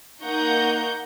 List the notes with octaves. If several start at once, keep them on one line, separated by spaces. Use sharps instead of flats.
A#3 D#4 F#5 A#5 C#6 G6